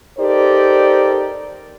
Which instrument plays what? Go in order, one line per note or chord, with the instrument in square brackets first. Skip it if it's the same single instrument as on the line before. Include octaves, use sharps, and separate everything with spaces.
[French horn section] D#4 G4 A4 A#4 C5 D5